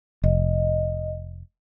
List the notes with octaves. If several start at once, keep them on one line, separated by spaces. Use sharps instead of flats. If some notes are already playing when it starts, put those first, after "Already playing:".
F1 D#5